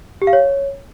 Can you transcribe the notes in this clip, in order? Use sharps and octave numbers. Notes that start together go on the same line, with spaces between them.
G4
F5
C#5